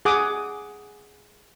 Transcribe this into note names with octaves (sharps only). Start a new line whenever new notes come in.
G#4 F#5 D6 D#6